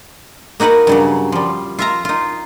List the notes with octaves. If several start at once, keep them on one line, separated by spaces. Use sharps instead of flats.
A#3 D#4 F#4 B4 F#5
G2 C#3 F#3
F3 G3
F4 E5 A#5
D#4 F4